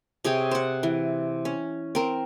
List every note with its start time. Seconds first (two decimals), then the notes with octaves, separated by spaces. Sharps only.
0.25 C3 G#4 C#5 G5
0.51 C5 F#5
0.83 E3
1.45 C#4
1.95 C4 A#4